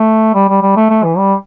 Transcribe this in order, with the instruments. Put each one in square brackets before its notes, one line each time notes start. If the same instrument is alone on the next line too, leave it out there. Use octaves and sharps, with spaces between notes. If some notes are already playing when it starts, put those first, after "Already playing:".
Already playing: [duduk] A3
G3
G3
G3
A3
A3
E3
G3